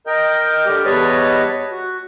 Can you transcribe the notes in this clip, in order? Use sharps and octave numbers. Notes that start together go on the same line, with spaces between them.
A#4 D#5 G5
D3 G3 G4 F6
E2 G3 B4 C#5 D#5 A5
F#4